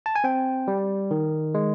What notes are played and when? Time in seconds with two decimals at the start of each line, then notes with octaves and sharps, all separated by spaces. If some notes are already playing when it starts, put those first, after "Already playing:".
0.06 A5
0.15 G#5
0.24 C4 G5
0.68 G3
1.11 D#3
1.54 G#3